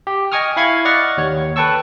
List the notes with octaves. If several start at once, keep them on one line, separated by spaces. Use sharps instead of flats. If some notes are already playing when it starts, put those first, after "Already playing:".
G4
D#5 G5 G#5 C#6 D#6 F6
E4 F5 B5 C#6 G#6
D5 D#5 F#5 C#6 F6 A6
D#2 C#5
A4 B4 G5 A5 C#6 E6